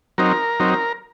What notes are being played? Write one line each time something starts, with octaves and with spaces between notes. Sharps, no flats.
F#3 C4 D#4 A#4
F#3 C4 D#4